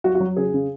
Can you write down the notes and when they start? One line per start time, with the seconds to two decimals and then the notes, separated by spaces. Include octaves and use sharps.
0.04 F#3 F#4
0.15 F#4
0.20 F#3
0.37 C#3 G#4
0.54 C#3